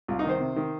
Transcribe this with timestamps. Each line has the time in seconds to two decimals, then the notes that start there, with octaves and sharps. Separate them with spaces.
0.08 C2 F4
0.19 D#4
0.25 D#3 C5
0.41 C3
0.56 D#3